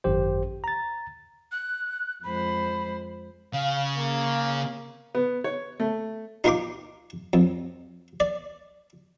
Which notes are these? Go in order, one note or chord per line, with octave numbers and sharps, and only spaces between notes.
G#1 F#2 G4 C5
A#5 A6
F#6
F2 G#3 C5 B5
C#3 F5
A#3
B3
C#5
A3
D#4 F4 A#4 G5 C6 D6
F2
D5